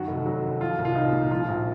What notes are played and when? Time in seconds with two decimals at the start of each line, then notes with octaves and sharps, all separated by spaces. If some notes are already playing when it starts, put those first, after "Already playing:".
Already playing: F#2 D#3 F#4
0.08 F1
0.26 F#3
0.43 D#2
0.61 F3 F4
0.78 C2
0.85 F4
0.95 C2 D#4
1.13 A#2
1.31 F3 F4
1.48 A#1